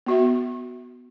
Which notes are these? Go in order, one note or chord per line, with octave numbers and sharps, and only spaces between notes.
B3 F#4 E5